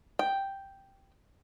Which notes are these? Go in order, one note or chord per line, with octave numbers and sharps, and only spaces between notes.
G5